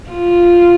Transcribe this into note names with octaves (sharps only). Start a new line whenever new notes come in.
F4